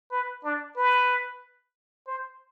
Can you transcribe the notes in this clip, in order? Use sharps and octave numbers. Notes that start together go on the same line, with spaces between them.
B4
D4
B4
C5